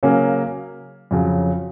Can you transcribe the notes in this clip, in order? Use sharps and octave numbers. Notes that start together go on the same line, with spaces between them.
C#3 F#3 A#3 C#4
F2 C#3 F#3